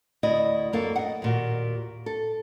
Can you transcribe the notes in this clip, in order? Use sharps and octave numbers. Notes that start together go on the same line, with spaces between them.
D2 E4 D5 D#5
F#2 A#3 A4 F5
D#5 F#5
D#2 A#2 F#4
A4